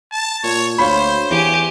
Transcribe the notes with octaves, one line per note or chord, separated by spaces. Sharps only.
A5
A#2 C#5
D2 C5 C#5 F5 B5
E2 G4 G#5